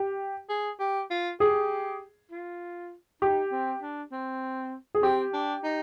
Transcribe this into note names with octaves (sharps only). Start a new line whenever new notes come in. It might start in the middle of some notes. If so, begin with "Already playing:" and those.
Already playing: G4
G#4
G4
F4
G4 G#4
F4
D#4 G4
C4
D4
C4
G#4
C4 G4
D4
D#4